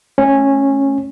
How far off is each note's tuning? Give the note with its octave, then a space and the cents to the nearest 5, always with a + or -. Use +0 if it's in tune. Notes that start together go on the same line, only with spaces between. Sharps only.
A3 -10 C#4 -10